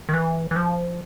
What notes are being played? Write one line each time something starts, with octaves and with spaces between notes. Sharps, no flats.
D#3
E3
E3
F3